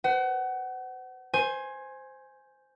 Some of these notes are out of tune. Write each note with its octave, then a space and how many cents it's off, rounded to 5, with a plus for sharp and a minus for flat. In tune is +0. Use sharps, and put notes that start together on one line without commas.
C5 -35 F#5 +25
C5 -5 G#5 +0 C6 +30